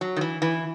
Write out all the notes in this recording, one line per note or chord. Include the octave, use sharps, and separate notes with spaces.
F#3
D#3
E3
E3